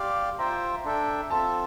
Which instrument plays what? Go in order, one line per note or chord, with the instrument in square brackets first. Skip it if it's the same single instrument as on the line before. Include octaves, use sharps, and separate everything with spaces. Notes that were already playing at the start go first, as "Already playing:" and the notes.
Already playing: [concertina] G4 D5 F5 [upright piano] C6
[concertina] F4 C5 E5 G5 [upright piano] A#5
[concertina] D4 A4 E5 G5
[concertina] C4 F4 A4 E5 [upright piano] A5